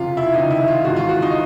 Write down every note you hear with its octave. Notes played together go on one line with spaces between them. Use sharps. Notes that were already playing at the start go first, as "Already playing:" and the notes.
Already playing: F#1 F2 C3 F4
E4
C#2 C3 D#3 D#4
E4
F4
G#1 G#2 E3 F#4
F4
F#4
D#4